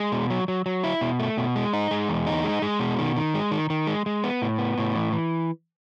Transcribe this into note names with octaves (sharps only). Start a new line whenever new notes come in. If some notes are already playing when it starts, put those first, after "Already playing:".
Already playing: G#3
B2
F#3
F#3
F#3
E4
B2
A3
B2
G#3
D#4
G#3
E2
D#4
G#3
G#3
B2
D#3
D#3
G#3
D#3
D#3
G#3
G#3
B3
A2
B3
A2
E3
E3